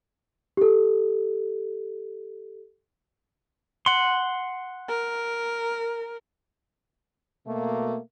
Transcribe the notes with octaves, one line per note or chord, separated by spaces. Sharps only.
G4 A4
F#5 C6
A#4
B2 A3 A#3